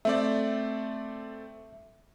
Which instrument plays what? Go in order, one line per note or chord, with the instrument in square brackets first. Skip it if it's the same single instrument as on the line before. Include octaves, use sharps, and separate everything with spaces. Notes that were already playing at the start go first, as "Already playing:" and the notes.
[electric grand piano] A3 C4 D5 [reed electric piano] E5